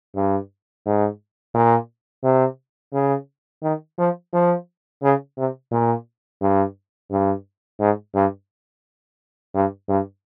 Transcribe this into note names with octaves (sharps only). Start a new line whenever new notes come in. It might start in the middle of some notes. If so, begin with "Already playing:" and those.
G2
G#2
A#2
C3
C#3
D#3
F3
F3
C#3
C3
A#2
G2
G2
G#2
G2
G2
G2